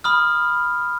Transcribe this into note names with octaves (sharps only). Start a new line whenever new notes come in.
B5 D#6 F6